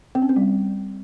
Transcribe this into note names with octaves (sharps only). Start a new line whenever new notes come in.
C4
C#4
C4
G3